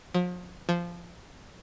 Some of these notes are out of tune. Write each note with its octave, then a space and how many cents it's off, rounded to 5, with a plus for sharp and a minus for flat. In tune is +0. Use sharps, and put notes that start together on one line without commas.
F3 +40
F3 -10